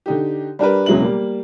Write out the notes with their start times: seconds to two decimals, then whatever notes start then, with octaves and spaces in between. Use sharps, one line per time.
0.06 D3 D#4 G4
0.59 G3 D4 A#4 B4
0.86 E1 C#3 F#3 G#3 E4 F#7
1.02 G3 A#3